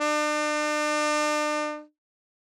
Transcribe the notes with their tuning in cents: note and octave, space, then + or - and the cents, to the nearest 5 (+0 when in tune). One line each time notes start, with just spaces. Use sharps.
D4 +40